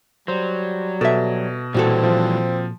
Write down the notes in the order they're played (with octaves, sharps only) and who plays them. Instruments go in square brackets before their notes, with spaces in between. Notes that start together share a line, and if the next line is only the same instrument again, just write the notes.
[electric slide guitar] F#3 [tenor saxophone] G3 [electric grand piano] C5
[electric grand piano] B2 [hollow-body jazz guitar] A4 E5
[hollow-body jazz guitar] A#2 F#4 A4 [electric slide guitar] E3 G3 [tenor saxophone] C4
[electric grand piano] F3